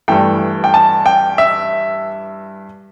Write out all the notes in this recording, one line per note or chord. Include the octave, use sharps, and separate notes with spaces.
G2 E3 A3 G5
G5
A5
G5
E5